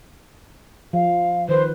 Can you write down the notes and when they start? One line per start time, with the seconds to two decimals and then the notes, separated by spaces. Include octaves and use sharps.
0.93 F3 F5
1.49 D#3 B4 C5